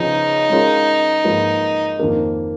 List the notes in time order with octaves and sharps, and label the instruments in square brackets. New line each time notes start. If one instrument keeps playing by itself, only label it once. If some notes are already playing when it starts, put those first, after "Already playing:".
Already playing: [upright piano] C#3 F3 B3 [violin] D#4
[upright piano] G#3 C#4 F4 A#4 C#5
G#2 F3 A#3 F4 B4
F2 D#3 A#3